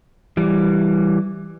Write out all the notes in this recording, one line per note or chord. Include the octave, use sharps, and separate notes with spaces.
E3 G3